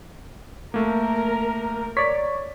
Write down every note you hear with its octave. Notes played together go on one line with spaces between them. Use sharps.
A3 A#3 A#4
C#5 D5 B6